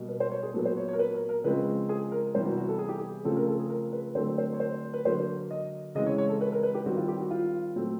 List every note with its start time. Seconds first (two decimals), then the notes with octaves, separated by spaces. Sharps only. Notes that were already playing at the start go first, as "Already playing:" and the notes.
Already playing: B2 G3 A#3
0.09 B4
0.20 C5
0.31 C#5
0.43 G#4
0.54 A#2 F#3 B3 A4
0.65 C5
0.77 C#5
0.88 C#5
0.93 A#4
0.99 B4
1.14 A#4
1.29 A#4
1.44 C#3 F3 G#3 C4 B4
1.89 G#4
2.11 A#4
2.34 C3 E3 G3 B3 C5
2.46 F#4
2.57 F#4
2.68 A4
2.78 G#4
2.89 G4
2.99 G#4
3.25 C#3 F3 A3 C4 A4
3.36 A#4
3.47 A4
3.59 G#4
3.70 A#4
3.93 B4
4.15 D3 F#3 A3 C4 C5
4.38 C5
4.54 C#5
4.60 C5
4.94 B4
5.05 D3 F#3 A#3 C5
5.51 D#5
5.95 C#3 E3 G#3 C4 D#5
6.06 C#5
6.18 C#5
6.29 A4
6.41 B4
6.52 A#4
6.63 B4
6.74 G4
6.85 D#3 G3 C4 F#4
6.97 F4
7.08 G4
7.20 F#4
7.31 F4
7.76 A#2 F#3 A3 C4